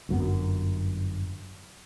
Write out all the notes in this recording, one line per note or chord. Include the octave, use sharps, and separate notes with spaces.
G1 F#2 F#3 B3